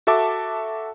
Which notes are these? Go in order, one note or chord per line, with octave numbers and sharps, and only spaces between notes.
F#4 A4 E5 A5 D6